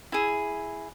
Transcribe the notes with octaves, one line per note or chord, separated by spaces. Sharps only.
E4 G#4